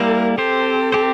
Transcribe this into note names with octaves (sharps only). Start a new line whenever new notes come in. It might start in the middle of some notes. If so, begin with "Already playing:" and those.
Already playing: G3 A#3 E4 A#4
C4 G4 A4 C5
C4 G4 C5